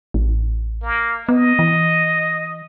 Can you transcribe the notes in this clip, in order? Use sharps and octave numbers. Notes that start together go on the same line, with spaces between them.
A1
A#3
B3 D#5
E3